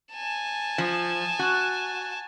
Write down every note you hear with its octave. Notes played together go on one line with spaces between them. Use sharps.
G#5 A5
F3
F#4